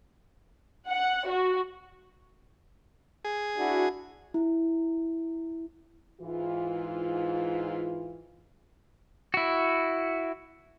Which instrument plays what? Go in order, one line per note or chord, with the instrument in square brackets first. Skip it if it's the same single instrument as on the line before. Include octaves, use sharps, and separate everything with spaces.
[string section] F#5
F#4
[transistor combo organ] G#4
[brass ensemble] D4 E4 F#4
[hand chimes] E4
[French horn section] G#2 E3 F4
[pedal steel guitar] E4 F#4